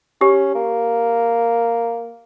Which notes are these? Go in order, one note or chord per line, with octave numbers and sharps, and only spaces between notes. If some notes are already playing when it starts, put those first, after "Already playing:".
C#4 G4
A#3